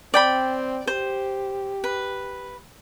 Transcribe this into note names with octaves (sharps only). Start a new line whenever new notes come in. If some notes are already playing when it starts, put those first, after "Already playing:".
C4 D5 G5 B5
G4 C5
B4